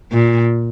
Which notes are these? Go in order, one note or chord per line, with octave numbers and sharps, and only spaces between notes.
A#2